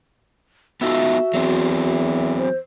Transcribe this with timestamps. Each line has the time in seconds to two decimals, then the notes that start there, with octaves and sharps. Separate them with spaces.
0.81 B3 D#4 F4 F#4 A4 E5
1.34 E2 F#3 C4
2.38 C5